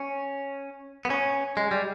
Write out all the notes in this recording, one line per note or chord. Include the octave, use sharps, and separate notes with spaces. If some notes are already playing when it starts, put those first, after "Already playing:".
Already playing: C#4
B3
C#4
G#3
G3